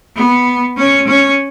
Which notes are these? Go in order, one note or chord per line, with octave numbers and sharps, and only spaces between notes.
B3
C#4
C#4